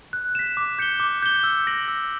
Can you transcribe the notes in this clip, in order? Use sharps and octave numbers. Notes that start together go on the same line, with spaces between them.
F#6
B6 E7
D6
G6 C#7 G7
D6
G6 C#7 G7
E6
G6 A#6 D7 F#7
E6